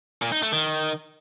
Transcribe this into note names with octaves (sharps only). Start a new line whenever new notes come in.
A#2
D#4
A3
D#3